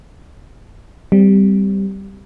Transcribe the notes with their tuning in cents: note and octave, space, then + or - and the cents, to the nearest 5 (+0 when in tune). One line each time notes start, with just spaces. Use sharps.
G3 +0 C4 -20